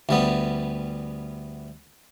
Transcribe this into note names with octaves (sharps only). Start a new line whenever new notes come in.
D2 G3 B3